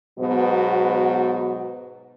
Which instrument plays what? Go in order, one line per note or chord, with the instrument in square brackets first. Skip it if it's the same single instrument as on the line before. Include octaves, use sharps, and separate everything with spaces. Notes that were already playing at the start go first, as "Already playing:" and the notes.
[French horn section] G#2 B2 F#3 B3